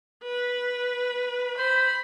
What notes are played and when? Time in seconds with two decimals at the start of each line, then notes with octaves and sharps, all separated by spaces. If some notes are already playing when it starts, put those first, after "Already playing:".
0.23 B4
1.58 C5 B5